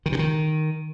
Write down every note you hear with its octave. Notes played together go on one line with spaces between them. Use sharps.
D#3
C3
D#3